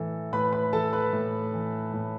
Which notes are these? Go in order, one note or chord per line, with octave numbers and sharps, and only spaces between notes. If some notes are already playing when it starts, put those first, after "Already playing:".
Already playing: A2 E3 A4
A2 B4 B5
B4 B5
E3 A4 A5
B4 B5
A2
E3
A2